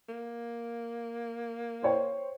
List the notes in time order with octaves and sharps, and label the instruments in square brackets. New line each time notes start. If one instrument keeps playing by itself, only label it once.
[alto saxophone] A#3
[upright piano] C5 C#5 G5